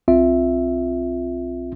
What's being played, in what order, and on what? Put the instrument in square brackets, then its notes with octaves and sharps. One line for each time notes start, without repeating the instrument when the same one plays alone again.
[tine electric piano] B1 C4 F4 E5